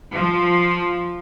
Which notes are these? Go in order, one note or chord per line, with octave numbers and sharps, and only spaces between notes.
F3